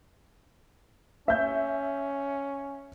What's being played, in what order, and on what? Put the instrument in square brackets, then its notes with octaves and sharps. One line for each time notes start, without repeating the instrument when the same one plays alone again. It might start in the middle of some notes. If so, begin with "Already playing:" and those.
[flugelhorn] C#4 [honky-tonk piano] E5 G6